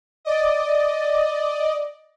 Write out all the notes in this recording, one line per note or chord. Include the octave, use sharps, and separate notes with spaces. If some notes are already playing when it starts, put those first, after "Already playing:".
D5 D#5